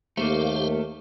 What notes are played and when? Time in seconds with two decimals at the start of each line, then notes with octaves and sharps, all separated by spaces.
0.17 D#2 A3 A#3 G4 C5 F5